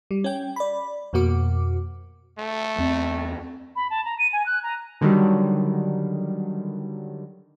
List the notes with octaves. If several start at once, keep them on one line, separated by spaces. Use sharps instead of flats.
G3
C#4 G5
D5 B5
F2 B2 A#3 F#4 D6
A3
E2 C4
B5
A5
A#5
D#7
G#5
F#6
A#5
D3 D#3 F#3 G3